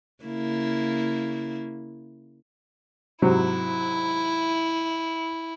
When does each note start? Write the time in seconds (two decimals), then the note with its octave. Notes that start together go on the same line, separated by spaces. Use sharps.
0.25 C#3 A#3 E4
3.22 G#2 C3 F#3 E4